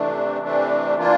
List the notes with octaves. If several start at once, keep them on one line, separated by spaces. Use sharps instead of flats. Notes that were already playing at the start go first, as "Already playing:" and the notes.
Already playing: C3 E3 A3 D4
C3 E3 A3 D4
E3 A#3 D4 F4